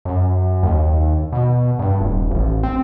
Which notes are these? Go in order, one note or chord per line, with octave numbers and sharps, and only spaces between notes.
F#2
D#2
B2
G2
D#1
A1
C4